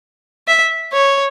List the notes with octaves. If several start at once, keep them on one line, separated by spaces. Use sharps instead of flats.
E5
C#5